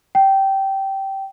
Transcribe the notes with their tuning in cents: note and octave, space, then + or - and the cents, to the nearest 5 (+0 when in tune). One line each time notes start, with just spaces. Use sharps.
G5 -15